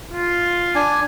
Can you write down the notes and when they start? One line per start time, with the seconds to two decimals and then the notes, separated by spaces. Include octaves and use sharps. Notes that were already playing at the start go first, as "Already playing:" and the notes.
0.12 F4
0.75 D4 G#5